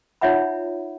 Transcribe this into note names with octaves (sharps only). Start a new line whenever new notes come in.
D#4 F4 C#5 E5 F#5 B5